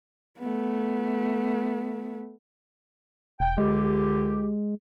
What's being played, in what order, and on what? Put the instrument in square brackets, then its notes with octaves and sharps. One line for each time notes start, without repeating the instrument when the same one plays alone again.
[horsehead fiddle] A3 B3
[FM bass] E1 [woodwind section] G5
[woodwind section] C#2 D3 G4 [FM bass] G#3